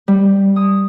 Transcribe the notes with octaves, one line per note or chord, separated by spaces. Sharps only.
G3
D#6